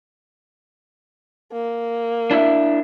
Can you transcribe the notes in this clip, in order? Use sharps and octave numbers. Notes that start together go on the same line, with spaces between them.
A#3
D4 E4 E5